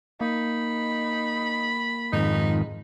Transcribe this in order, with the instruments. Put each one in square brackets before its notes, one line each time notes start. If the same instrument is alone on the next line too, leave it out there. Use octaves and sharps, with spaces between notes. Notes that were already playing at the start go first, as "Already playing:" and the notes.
[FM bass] A#3 [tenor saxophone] D#4 [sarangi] B5
[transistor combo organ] F2 G#2 D#3 [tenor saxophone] D#4